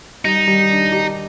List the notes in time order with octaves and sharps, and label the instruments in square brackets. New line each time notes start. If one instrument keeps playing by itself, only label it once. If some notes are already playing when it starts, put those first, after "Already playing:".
[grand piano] G3 [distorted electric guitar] D#4
[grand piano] G3
D4
G4